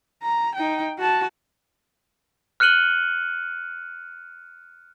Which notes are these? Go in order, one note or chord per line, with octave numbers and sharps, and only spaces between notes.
A#5
D#4 G5
F#4 A5
F6 F#6 C#7 D#7 F#7 G7